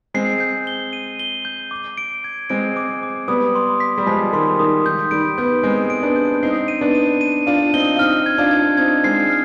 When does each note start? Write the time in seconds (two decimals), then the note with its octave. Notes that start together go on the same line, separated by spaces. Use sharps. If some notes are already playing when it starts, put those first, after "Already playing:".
0.14 G#3 C4 C7
0.40 G6
0.67 G7
0.93 D#7
1.20 G7
1.45 G6
1.71 D6
1.98 D7
2.24 G#6
2.50 G#3 C4 D7
2.77 D6
3.03 D6
3.28 G3 B3 D#6
3.55 C6
3.80 B6
3.98 G3
4.06 F3 G#3 B6
4.33 D#3 G3 C6
4.59 D#3 D#6
4.85 D#3 G6
5.11 D#3 G3 D7
5.38 G3 B3 G6
5.63 G#3 C4 G6
5.90 D7
6.03 B3 D4
6.16 G6
6.43 C4 D#4 C7
6.68 D#7
6.81 B3 D4
6.95 D#7
7.21 D#7
7.47 D4 F4 D#7
7.73 C4 D#4 G7
7.96 F4
7.99 C4 D#4 F6
8.26 G#6
8.38 D4 F4
8.51 G#6
8.77 C4 D#4 G#6
9.04 G#3 C4 C7
9.30 F6